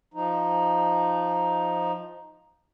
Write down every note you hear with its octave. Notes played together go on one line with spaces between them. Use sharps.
F3 D#4